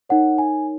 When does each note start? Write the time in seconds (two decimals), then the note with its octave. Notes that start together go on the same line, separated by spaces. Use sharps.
0.09 D#4 A#4 C#5 F#5
0.38 G#5